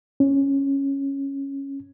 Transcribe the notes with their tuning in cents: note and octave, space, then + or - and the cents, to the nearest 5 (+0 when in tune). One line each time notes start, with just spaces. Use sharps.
C#4 -5